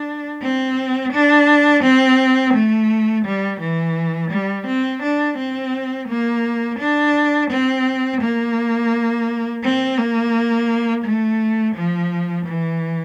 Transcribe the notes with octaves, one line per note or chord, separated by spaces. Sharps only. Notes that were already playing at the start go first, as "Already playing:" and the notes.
Already playing: D4
C4
D4
C4
A3
G3
E3
G3
C4
D4
C4
A#3
D4
C4
A#3
C4
A#3
A3
F3
E3